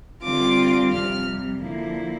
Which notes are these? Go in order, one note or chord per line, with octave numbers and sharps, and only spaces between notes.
D3 G3 C4 F4 D6
F2 C3 G3 F6
D3 F3 A#3 E4